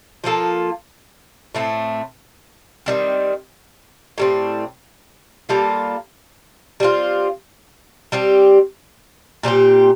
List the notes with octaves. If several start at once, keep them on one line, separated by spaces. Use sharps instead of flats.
F3 A#3 F4 A4
A2 A3 C4
D#3 G3 C4
A2 G3 C4
G3 A#3 F4 A4
G3 C4 F4
G3 C4 G4
A#2 G3 C4 G4